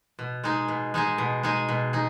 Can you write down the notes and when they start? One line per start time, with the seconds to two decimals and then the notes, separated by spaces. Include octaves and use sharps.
0.19 B2
0.44 G#3 D#4 G#4
0.68 B2
0.94 G#3 D#4 G#4
1.18 B2
1.43 G#3 D#4 G#4
1.68 B2
1.93 D#4 G#4